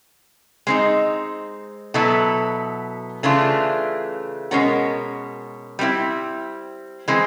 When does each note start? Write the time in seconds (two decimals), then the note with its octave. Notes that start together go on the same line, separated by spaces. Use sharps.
0.67 G#3 C4 D#4
1.94 B2 F#3 B3 E4 A4
3.23 C#3 E3 A3 D4 F4
4.51 B2 G#3 C#4 F#4 A#4
5.79 G3 C4 E4
7.08 E3 G#3 C4